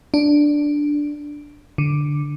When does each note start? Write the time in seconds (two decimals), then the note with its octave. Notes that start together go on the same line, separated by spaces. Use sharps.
0.14 D4
1.78 D3